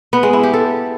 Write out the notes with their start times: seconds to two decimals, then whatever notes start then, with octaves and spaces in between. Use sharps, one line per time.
0.13 B3
0.23 G#3
0.33 E4
0.43 G4
0.54 A4